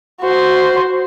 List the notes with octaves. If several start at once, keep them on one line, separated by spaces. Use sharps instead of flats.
F#4 C5